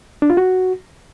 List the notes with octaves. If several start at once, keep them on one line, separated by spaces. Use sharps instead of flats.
D4
F4
F#4